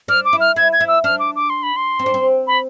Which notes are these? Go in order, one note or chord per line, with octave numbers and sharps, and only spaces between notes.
D4 F6
D6
E4
F6
E4 G#6
G#6
E4
E6
D4 F6
D6
D6
C6
B5
C6
C4
D4
C4
B5